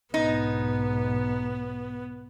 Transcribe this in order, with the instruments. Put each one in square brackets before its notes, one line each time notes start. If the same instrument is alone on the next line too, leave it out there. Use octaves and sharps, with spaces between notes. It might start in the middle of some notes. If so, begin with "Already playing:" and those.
[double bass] B1 G#2 [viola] B3 [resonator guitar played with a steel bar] D#4